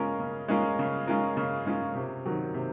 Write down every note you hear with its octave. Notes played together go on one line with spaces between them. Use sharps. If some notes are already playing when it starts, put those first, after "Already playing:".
Already playing: C#3 G#3 C#4 F4 A#4
C#3
G#3 C#4 F4 A#4
C#3
G#3 C#4 F4 A#4
C#3
G#3 C#4 F4 A#4
C3
D#3 F#3
C3